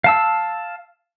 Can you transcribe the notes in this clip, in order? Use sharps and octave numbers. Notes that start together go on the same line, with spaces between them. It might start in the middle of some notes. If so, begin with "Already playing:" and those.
F5 A5 E6